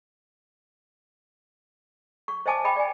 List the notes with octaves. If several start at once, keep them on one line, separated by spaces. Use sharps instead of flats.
C#6
C5 D#5 E5 G#5 A5 D6
D#5 E5 G5 B5 D6
D5 G#5